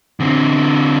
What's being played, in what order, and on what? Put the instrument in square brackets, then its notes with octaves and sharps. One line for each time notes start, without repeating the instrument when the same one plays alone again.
[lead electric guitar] D3 C4